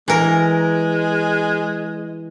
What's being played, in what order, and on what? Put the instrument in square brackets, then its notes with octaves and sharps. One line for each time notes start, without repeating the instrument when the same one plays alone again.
[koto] E3 A#4 [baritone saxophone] G#3